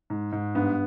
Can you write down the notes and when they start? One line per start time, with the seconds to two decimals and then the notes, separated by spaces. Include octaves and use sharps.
0.10 G#2
0.32 G#2
0.55 G2 B3